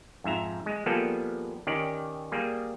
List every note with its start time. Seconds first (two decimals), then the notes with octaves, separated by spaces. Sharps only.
0.24 F2 G#2 E5 A#5
0.66 G#3
0.86 F3 G3 A#3 B3 G#4 A4
1.67 D#3 C#4 G4 D5
2.32 G3 A#3 G#4